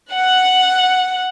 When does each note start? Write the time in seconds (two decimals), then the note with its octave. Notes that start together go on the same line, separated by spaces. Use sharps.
0.12 F#5